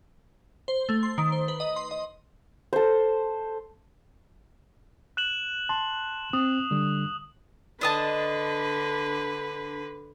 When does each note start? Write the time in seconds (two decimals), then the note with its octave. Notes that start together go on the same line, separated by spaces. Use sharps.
0.68 C5
0.89 A3
1.03 C6
1.18 D#3
1.32 C5
1.48 B4
1.60 D#5
1.76 C6
1.91 D#5
2.73 A4 C5
5.17 F#6 E7 F#7
5.69 A5 C6
6.33 C4 D#6
6.71 D3 G3
7.81 D3 D4 B4 D#5 A5